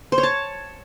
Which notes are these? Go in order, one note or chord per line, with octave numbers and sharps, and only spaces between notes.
C5
C#5
A5